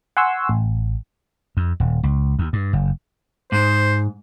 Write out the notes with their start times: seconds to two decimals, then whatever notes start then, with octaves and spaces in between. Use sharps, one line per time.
0.17 F#5 G#5 C6 C#6 E6
0.49 A1
1.57 F2
1.80 D#1
2.03 C#2
2.39 D#2
2.53 G2
2.73 F#1
3.52 G#2 C5